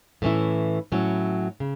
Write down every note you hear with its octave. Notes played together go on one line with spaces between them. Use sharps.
A2 E3 C#4 E4
A2 F#3 C#4 E4
C#3